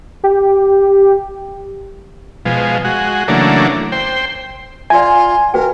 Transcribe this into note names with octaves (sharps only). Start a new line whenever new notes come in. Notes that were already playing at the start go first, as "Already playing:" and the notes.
G4
B2 F3 G#3
G#3 F#4
C#3 E3 F#3 A3 A#3 D4
C5 G5
F4 D5 E5 G#5
F#4 A#4 B4 G5